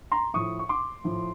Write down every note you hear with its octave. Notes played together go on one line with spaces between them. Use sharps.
A#5 C6
A2 F3 C#6 D#6
C#6
C6 D6
A2 F3